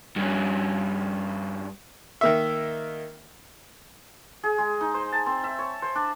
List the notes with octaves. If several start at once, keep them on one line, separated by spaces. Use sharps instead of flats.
G2 C#4
D#3 A#3 E5
G#4
G#3
D#4
C5
A5
C4
E5
C#5
C5
D4